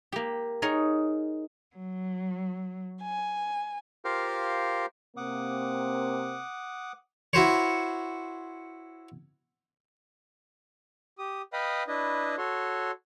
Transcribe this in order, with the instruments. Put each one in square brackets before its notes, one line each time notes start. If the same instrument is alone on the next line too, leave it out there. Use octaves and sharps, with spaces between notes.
[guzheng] A#3 G4
D#4 G#4 A#4 C#5
[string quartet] F#3
G#5
[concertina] F4 G4 A#4 C5 F5
[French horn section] C3 A#3 C4 [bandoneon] F#5 D6 D#6
[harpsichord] E4 F#4 C5 C#5
[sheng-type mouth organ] G4 D#6
B4 D#5 F5 G5 B5 D#6
D4 E4 B4 D#5
F#4 A4 C#5 C6